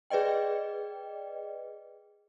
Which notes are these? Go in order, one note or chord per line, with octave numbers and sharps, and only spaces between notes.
G#4 B4 D5 D#5 G5